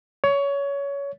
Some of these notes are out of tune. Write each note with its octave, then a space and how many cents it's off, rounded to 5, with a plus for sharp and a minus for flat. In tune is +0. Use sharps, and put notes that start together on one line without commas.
C#5 +20